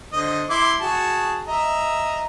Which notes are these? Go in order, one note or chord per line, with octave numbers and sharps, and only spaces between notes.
D3 C5 D#5
E4 C6 D6
F#4 G#4 A5
D#5 E5 A#5